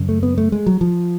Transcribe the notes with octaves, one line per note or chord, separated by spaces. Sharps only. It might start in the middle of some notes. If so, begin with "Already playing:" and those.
Already playing: F#2 C#3
A3
B3
A3
G#3
F#3
F3